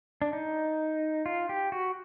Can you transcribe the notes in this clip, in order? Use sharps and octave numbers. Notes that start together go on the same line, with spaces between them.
D4
D#4
F4
G4
F#4